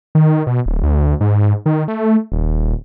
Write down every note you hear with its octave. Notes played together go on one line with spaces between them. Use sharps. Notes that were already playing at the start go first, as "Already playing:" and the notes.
D#3
B2
D1
D2
G#2
D#3
A3
D#1